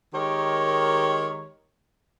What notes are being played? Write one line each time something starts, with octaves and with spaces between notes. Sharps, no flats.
D#3 G#3 G4 A#4 C#5